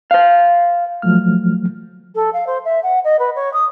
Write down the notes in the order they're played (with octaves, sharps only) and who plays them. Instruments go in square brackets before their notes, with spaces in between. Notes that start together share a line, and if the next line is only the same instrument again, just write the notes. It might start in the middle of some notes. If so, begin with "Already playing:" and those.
[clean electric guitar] C5 F5
[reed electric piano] F3 F#3 A3 F6
[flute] A4
F5
C5
E5
F#5
D#5
B4
C#5
D#6